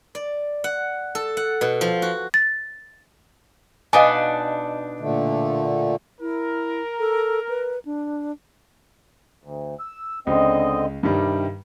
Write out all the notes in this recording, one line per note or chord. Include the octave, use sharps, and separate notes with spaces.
D5
F#5
A4
F#5
B2
F3
F#4
A6
B2 D4 D#4 B4 F5 G#5
A#2 D3 A3
E4 A#4
A4
B4
D4
D2
E6
C#2 D3 C4 D#5
G2 C3 D#3 G3